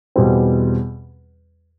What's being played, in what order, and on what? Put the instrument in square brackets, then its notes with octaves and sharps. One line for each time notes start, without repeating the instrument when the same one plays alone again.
[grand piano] E2 B2 G3 C4